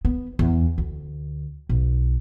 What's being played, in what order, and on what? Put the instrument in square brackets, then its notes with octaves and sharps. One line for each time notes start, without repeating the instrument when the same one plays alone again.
[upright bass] B3
E2
D2
B1